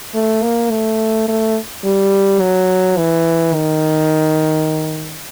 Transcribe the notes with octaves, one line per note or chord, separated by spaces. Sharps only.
A3
A#3
A3
A3
G3
F#3
E3
D#3